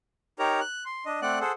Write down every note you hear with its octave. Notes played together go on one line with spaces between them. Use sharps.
D#4 G4 A#4 C#5 A#5
F#6
C6
D4 D#5
A3 C4 D5 F#5 F#6
G#4 A4 C5 F#5